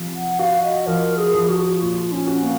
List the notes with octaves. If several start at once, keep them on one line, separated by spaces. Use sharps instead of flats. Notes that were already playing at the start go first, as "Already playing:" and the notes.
Already playing: C3 F3
F#5
F#4 F5
D#5
F3 A#4
G#4
F3
F#4
A#2 F4
C#4
F#4
A#3